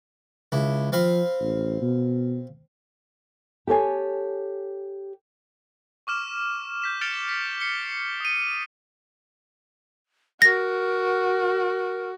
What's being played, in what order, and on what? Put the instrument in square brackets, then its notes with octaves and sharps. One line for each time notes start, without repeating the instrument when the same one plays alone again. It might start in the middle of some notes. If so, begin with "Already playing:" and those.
[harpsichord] C#2 E4
[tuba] F3 [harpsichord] C4 F5 B5
[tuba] A1
B2
[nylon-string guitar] G4 A4 C#5 G#5
[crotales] C#6 D6 F6 E7
G6 B6 E7
F6 A6 C#7 D7 F7 G7
B6
C7 C#7 G7
D#6 D#7
[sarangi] F#4 [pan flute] A#4 [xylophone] A#6